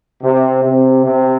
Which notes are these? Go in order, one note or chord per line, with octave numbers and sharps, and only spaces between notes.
C3
C3
C3